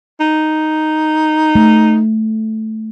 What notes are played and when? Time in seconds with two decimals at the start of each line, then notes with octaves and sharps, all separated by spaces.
0.20 D#4
1.55 A3